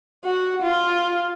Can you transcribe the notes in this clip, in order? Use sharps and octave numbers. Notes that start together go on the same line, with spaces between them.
F#4
F4